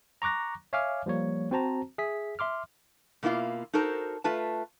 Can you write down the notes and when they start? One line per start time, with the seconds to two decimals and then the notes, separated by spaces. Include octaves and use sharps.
0.22 A#5 C#6 D6 F#6 A#6
0.73 C#5 E5 F5 G#5 D6 F6
1.06 F3 G3 A#3 C#5
1.51 C4 F#4 C5 A5 A#5
1.98 G#4 E5 B6
2.39 E5 C6 D6 F6
3.23 B2 A#3 E4 F4 F5
3.73 D#4 F#4 A4 A#4 C5
4.24 A3 F4 B4 A5